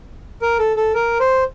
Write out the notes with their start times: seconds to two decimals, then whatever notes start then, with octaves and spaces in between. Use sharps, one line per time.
0.42 A#4
0.59 A4
0.77 A4
0.94 A#4
1.20 C5